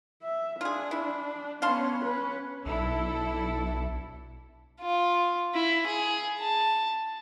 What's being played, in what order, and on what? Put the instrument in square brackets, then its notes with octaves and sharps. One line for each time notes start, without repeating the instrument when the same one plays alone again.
[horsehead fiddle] E5
[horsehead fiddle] D4 [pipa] F4 G#4
[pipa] E4
[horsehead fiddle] B3 C#4 [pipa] F5 A5 C6
[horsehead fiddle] C#4 B4
[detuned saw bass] B1 [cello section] D4 E4 A4
[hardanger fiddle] F4
E4
G#4
A5